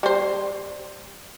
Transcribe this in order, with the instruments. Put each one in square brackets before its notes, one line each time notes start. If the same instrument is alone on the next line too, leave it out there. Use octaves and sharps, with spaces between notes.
[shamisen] G3 C5